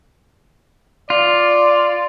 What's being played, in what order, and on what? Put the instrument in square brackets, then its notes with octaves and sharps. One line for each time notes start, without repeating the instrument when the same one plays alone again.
[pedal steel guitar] F4 [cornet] D5